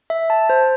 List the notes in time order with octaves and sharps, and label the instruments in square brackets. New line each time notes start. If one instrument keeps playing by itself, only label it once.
[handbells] E5
A5
C5